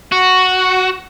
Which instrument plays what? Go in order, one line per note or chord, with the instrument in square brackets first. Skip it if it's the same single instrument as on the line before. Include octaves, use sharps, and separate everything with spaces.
[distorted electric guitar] F#4